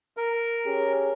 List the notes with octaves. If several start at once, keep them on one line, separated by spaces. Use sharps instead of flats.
A#4
C#4 G4 G#4